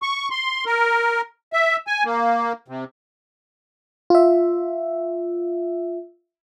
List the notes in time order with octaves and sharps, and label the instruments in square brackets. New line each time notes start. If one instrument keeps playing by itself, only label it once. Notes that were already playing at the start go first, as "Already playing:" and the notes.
[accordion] C#6
C6
A#4
E5
G#5
A#3
C3
[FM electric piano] F4 E5